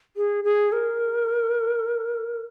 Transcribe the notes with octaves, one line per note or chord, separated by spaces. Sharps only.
G#4
G#4
A#4